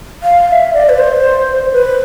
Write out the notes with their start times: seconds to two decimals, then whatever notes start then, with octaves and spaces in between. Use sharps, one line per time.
0.23 F5
0.48 F5
0.52 E5
0.74 D5
0.89 B4
0.98 C5
1.73 B4